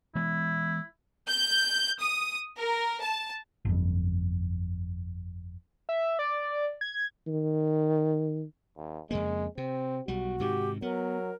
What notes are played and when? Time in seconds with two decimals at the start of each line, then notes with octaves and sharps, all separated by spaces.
0.15 E3 G#3 B3 E4
1.29 G6
2.01 D#6
2.57 A#4
3.01 A5
3.65 G1 F2
5.89 E5
6.19 D5
6.81 G#6
7.27 D#3
8.77 D#2
9.11 F2 C#3 G#3 A#3
9.58 C3 C4
10.08 B1 G3 F#4
10.40 G#2 C3 D#3 G4
10.82 F#3 B3 A#4